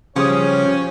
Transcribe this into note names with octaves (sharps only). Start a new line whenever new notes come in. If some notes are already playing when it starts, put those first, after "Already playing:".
C#3 F3 G3 C#4 G#4 C#5 D#6